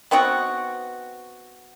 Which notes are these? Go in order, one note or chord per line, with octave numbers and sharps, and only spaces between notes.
B3 C4 D#4 F#4